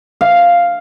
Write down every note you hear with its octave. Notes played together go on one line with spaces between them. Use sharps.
F5